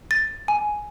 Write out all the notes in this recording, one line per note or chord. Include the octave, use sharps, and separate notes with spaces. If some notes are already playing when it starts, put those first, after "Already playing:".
A6
G#5